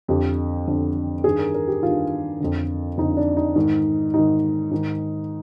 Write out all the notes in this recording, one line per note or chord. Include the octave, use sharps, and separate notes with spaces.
F2 D3 G4
F2 D3
G2 D#3 G#4
A#4
A#4
G4
G2 D#3 F4
F2 D3
F2 D3 D#4
D4
D#4
G#2 D#3
G#2 D#3 D#4
G#2 D#3